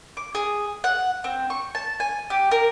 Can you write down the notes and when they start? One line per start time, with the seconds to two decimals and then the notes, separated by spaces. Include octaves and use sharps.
0.17 D6
0.35 G#4
0.84 F#5
1.24 C4
1.50 C#6
1.75 A5
2.00 G#5
2.30 G4
2.51 A#4